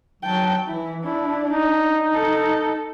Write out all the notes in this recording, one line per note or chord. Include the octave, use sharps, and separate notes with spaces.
F#3 G5 A5
E3 E4
D4 E4
D#4
A4